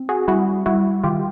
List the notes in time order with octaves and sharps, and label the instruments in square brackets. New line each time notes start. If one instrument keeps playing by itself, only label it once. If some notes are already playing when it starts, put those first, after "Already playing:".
Already playing: [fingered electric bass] C4
[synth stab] F#4 G#4
[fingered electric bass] G3 [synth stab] E4 F#4
[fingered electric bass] G3 [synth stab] E4 F#4
[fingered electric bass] D#3 [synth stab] F4 G4